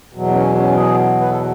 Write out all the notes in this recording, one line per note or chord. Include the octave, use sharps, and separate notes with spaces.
E2 B2 F#3
B3
C#4
C#4
G#4
B4
A4